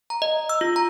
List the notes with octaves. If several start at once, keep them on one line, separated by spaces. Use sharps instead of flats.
A#5
D#5
E6
F4
A#5